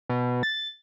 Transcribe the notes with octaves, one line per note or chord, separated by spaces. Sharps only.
B2
A6